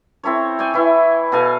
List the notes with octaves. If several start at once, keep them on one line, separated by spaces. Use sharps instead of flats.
C4 E4 A4 C#5
C#5 D5 G5 G#5
E3 E4
B2 A4 F5 G#5